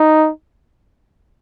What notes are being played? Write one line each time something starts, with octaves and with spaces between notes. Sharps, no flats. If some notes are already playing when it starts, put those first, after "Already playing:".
Already playing: D#4